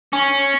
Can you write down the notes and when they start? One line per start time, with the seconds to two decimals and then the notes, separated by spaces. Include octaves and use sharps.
0.13 C#4